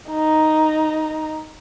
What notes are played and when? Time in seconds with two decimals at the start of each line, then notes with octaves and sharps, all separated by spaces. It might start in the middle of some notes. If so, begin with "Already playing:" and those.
0.11 D#4 A#5